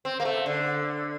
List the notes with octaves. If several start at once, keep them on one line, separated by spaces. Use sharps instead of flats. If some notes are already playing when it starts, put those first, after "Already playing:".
C4
A#3
A3
D3